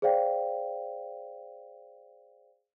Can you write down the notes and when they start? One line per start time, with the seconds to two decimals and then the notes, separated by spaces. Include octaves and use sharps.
0.02 G#4 C5 D5 F5 G5